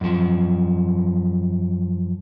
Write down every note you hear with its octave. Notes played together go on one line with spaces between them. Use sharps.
F#2 F3